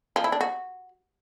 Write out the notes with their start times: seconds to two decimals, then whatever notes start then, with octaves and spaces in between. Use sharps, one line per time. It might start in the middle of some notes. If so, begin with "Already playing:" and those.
0.16 F3
0.24 E4
0.32 D4
0.41 F#4